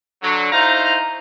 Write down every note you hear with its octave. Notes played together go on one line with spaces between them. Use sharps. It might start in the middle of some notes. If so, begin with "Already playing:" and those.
D3 F#3
D#4 E4 C5 F5 A#5